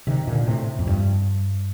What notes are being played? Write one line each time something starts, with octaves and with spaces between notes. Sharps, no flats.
C3 D#3
A#2 D3
A2 C3
F2
G2